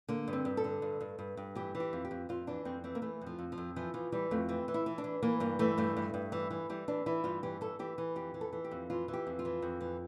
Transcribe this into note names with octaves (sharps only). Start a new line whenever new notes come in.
D3 A#3
G2
C4
G2
A4
D3
G2
G2
G2
G2
E3 G4
E3
G4
F2
G4
F2
F2 F4
E3 D4
F2 C4
E3 C4
A#3
E3 A3
F2
F3
F2
F3
F2
E3 F3
E3 F3
E3 G3
F2 A3
E3 C4
E3
E4
E3
D4
E3
E3 A#3
G2 A#3
E3 A3
G2 A3
G2
G2
E3
E3
E3 G3
E3 D4
E3 E4
G2 F4
E3 G4
E3 A4
E3 G4
E3
F2 G4
E3
A4
E3
G4
F2
E3 F4
E3
G4
F2
F4
E3
F2
E3